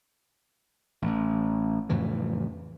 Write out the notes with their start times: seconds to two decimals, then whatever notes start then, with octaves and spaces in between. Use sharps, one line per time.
1.02 A1
1.89 F2 A2 C#3 E3